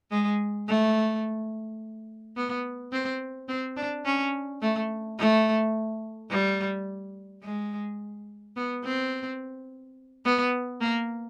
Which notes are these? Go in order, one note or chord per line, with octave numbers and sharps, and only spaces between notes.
G#3
A3
B3
C4
C4
D4
C#4
A3
A3
G3
G#3
B3
C4
B3
A#3